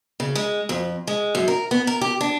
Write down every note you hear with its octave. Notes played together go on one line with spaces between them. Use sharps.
C#3
G#3
F2
G#3
F#2
A#4
B3
A#4
G4
D4